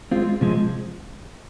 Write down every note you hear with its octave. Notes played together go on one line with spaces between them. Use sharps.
G#3 C4 F4
C3 F3 G#3 C4